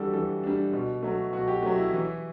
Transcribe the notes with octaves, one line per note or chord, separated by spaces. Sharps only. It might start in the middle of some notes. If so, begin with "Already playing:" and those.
Already playing: E3 G3 D4 F#4 G4 A4
E3 A4
G3 D4
B2
F#3 A3
B2 F#4
G4
F#3 A3
E4
E3